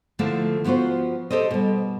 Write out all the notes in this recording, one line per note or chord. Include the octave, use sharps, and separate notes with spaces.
D3 F3 A3 A#3 E4 A4
F3 B3 F4 F#4 C5
G4 A4 C5 D#5
B2 G3